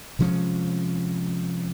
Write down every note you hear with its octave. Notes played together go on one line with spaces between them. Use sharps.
C3 F3 G#3 C#4